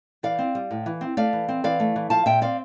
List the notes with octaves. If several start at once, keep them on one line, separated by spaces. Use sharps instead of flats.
E3 D5 F5
C4
G3
A2
E3
C4
A3 D5 F5
E3
C4
E3 D5 F5
A3
E3
F3 F5 A5
A#2 E5 G5
C4 D5 F5